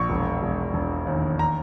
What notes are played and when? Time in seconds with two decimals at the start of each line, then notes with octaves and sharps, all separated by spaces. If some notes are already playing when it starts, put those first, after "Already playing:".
Already playing: A#1 C#6
0.10 E1
0.43 E1
0.74 E1
1.07 D#2
1.39 A#5